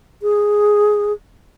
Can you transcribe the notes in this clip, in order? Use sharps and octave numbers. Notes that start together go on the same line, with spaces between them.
G#4